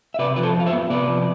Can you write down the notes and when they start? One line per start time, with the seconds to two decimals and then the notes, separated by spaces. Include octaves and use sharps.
0.14 E5
0.19 C3 B4 D5
0.36 F3 B4
0.43 A4 C5
0.54 F2
0.60 F5
0.66 C5 E5
0.72 B3
0.90 C3 B4 D5
1.08 F3